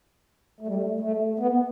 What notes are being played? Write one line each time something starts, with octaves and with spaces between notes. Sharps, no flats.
A3
G3
A3
A3
B3